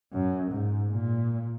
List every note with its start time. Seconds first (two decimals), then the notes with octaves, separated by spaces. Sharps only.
0.13 F#2
0.52 G#2
0.91 A#2